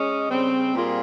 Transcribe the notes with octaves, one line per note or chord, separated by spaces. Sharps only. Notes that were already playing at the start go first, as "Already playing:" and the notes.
Already playing: G#3 C#4 G#4 D#5
C#3 G3 C4
A#2 G3 A#3 F4 G#4